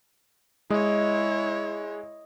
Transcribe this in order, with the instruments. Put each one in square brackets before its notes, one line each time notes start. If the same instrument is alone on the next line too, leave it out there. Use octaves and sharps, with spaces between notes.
[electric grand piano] G#3 [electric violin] E4 C#5 [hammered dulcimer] D#5